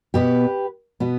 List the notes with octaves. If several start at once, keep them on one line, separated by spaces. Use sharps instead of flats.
B2 B3 G4 B4
B2 B3